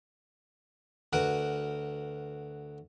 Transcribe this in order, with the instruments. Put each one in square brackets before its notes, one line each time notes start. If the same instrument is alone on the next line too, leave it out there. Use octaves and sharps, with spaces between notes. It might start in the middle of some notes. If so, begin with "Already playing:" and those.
[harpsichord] D2 F#4 A#4 B4